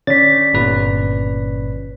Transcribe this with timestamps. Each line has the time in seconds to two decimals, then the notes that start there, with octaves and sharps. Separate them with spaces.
0.07 D3 C#4 C#5 D5 A6 B6
0.53 G1 A#2 B4